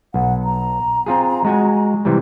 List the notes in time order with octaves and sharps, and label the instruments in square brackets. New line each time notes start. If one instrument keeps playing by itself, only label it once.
[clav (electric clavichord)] B1 [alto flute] F#5
[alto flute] A#5
[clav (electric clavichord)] C4 F4 G#4
G#3 F#4 G#5
C3 E3 G3